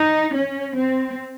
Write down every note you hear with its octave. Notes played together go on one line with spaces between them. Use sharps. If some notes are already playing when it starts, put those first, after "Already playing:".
Already playing: D#4
C#4
C4